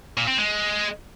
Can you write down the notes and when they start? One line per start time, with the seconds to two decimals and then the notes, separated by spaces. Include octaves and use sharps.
0.17 A#2
0.28 C4
0.38 G#3